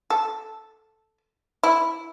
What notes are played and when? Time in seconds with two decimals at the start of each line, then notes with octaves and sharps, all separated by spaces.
0.10 A4
1.63 E4